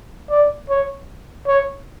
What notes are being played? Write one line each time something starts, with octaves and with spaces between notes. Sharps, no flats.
D5
C#5
C#5